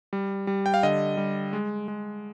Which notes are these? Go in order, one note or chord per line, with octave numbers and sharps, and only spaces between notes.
G3
G3
G5
F5
D3 D#5
G3
G#3
G#3